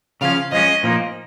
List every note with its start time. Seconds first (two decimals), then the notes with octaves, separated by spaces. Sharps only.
0.21 C#3 F3 C#4 F5
0.52 F3 G#3 C#4 D#5
0.83 A#2 F3 A#3 D#4